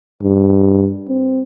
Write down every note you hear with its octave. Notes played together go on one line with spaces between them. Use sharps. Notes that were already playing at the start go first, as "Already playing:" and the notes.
G2
C4